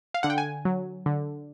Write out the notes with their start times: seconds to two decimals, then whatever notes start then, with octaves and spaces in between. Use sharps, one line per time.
0.14 F5
0.23 D3 F#5
0.30 G5
0.38 G#5
0.65 F#3
1.06 D3